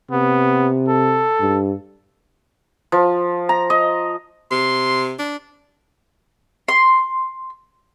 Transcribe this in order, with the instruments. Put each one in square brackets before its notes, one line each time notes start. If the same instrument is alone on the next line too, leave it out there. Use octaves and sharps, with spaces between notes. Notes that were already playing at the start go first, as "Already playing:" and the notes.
[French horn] C3 [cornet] B3
[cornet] A4
[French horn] G2
[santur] F3
A#5
D#5
[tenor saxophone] C3 [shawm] C6
[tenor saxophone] D4
[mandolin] C6